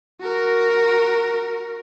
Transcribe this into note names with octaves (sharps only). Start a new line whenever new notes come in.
F#4 A#4